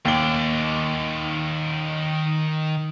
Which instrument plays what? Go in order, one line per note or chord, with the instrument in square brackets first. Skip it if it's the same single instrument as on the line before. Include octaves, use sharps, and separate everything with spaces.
[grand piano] D#2 G7 [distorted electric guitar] D#3 D5